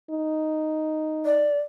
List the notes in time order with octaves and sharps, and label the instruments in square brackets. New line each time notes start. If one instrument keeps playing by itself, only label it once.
[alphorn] D#4
[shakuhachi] D5